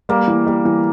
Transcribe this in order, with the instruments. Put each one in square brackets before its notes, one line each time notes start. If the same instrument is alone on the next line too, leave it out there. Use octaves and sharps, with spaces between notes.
[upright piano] G3 [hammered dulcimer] A#3
[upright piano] E3
G3
E3